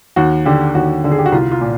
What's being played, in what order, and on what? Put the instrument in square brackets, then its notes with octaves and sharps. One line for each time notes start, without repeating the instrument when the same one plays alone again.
[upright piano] D#2 F#4
D3 G4
D#2 F#4
D3
G#4
G4
F#4
C2 F4
F4
A#2